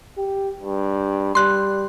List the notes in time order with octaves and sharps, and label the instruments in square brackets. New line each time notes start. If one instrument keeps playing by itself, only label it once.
[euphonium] G4
G2
[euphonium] G3 [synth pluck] C6 F#6